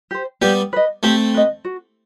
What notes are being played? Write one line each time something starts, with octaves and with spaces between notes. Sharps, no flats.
G4 C5
G3 B3 G4
B4 D#5
A3 C4 G4
B4 D#5
F#4